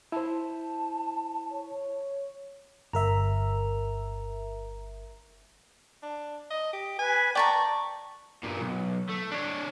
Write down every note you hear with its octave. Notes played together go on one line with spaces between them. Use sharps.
E4 C5 A5
C#5
G1 A#4 E5 A#5
D4
D#5
G4
B4 G#5
D5 G5 A5 A#5 C#6
G2 A#2
B1
A3
D4 C#5